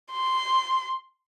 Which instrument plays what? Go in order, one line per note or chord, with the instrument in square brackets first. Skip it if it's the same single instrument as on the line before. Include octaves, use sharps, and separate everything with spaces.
[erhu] C6